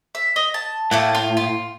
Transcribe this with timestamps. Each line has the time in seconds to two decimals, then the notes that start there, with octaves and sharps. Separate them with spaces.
0.15 E5
0.36 D#5
0.54 A5
0.91 A2 A3 A#3 F#5
1.15 F4
1.37 F4